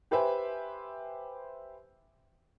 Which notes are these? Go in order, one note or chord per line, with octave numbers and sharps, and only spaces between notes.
G4 B4 C5 E5 G#5